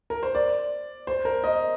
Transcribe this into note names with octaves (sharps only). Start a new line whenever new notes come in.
A#4
C5
D5
C5
A#4
D#5